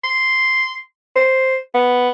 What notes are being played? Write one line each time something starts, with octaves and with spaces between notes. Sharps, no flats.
C6
C5
B3